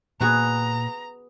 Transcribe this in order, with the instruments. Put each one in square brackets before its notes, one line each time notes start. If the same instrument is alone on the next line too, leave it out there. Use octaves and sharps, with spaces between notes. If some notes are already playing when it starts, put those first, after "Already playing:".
[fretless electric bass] A#2 [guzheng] B3 F#4 G#4 [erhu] A#5